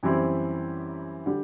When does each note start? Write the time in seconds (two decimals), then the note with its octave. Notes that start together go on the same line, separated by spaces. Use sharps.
0.03 F#2 E3 G3 C4 E4
1.26 D3 G3